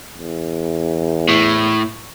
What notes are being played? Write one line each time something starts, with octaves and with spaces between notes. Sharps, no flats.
E2
A2